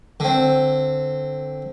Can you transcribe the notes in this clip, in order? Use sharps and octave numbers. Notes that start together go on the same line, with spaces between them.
D3 C4